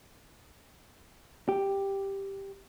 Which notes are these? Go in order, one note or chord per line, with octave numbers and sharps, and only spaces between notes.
G4